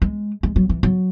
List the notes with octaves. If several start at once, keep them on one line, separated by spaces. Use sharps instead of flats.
G#3
G#3
F#3
E3
F#3